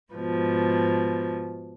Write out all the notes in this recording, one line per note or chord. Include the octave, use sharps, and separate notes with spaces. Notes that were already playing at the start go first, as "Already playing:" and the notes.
G#2 B2 F3